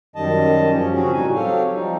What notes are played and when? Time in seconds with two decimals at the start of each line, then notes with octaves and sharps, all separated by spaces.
0.16 F#2 D#3 G3 D#5 A5
0.71 F3 C#4
0.94 C#3 F#3 C4 C#4 F#4 G#4
1.13 A2 G3 D#4 F#4 G#5
1.35 F#3 C4 G4 A4 C#5 F5
1.73 F3 G3 D#4